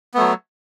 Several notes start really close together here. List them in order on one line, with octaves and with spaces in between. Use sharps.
B3 A3 F#3